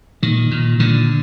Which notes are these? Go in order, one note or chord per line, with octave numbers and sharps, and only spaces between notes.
A#2 D#3
A#2
A#2 D3